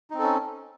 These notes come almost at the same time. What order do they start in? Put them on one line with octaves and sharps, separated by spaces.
D#4 C4 A4 C#4